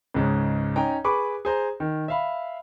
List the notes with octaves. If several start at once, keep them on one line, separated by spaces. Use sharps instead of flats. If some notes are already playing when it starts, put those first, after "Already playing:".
C#2 G#2 C#3
C#4 D#4 G5 A#5
G#4 B4 B5 C#6 D6
G#4 C5 A#5
D#3
E5 F5 B5